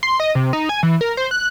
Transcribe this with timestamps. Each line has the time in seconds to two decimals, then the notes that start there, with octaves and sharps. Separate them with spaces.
0.03 C6
0.20 D#5
0.35 C3
0.53 D#4
0.69 G#5
0.83 E3
1.01 A#4
1.17 C5
1.31 F#6